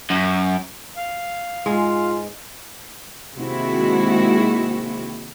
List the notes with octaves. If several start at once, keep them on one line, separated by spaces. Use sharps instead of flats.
F#2
F5
G#2 G#3 F4
C3 D#3 G#3 A#3 E4 F#4